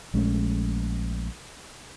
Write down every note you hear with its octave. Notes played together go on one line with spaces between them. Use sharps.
A#1 G#3 A3 C#4